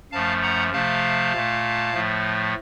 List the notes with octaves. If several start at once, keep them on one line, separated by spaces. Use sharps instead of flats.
F#2 F3 A3 F5 A5
F#5 A#5
C3 F3 A3 F5 A5
A#2 A3
A2 F3 A3